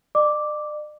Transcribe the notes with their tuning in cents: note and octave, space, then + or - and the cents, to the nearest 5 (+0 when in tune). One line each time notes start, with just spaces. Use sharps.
D5 +45 D6 +0